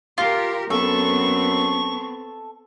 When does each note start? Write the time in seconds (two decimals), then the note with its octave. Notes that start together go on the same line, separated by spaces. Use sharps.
0.18 F4 G4 A#4
0.70 F#2 B3 C4 A4 C#6